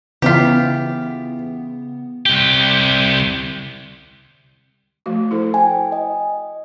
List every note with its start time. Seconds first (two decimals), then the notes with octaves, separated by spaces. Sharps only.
0.22 C#3 E3 B3 F4 G4 B6
2.26 C2 G4
5.06 F3 A3 F#4
5.31 E4 A4 C5
5.54 G5 G#5
5.92 D#5